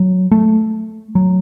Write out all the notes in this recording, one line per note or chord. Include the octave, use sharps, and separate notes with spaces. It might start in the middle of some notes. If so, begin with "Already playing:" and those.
Already playing: F#3
A3
F#3